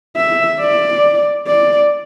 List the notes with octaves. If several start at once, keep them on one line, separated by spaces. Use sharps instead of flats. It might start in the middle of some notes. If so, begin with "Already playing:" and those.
E5
D5
D5